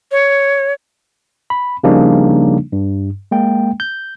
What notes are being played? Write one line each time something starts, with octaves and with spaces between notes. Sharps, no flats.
C#5
B5
C#3 F3 G3 A#3 D4 D#4
G2
G#3 A#3 G5
G6